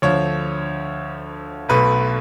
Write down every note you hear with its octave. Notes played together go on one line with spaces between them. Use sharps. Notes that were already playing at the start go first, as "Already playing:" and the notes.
D2 D3 F3 C#5
B1 B2 A3 B4